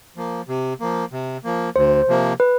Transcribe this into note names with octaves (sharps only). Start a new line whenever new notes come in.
F3 A#3
C3
F3 A#3
C3
F3 A#3
D2 C5
C3 F3 A#3
B4